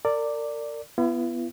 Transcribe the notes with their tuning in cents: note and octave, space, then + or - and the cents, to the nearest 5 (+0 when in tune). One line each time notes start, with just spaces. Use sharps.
A#4 -35 D5 +0
B3 +0 E4 +45